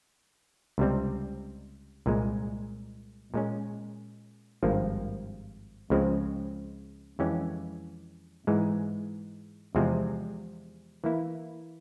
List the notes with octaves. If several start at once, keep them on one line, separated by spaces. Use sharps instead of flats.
C#2 C3 G3 C4
C2 A#2 G#3
A#2 G#3 C#4
G#1 G2 F3 A#3
C#2 C#3 F3 G#3 C4
F2 E3 G#3 C#4 G4
G#2 E3 G#3
E2 C3 F3 G#3 C4
E3 A#3 E4